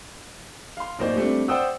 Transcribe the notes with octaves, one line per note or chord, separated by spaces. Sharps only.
F5 C6
D1 A#3 D#4 C5 D5
G3 A3 C4 D4
C5 D5 F#5 G5 D#6 E6